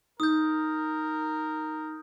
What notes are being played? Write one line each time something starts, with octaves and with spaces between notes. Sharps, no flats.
D#4 A#4 D#6 G6